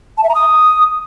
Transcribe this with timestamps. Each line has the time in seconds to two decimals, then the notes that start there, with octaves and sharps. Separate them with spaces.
0.18 A5
0.23 E5
0.29 A#5
0.35 D#6